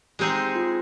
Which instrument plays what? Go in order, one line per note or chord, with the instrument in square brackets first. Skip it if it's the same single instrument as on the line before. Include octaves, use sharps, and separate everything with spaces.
[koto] G#3 C4 D#4 G#4 [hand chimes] G4
[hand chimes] F4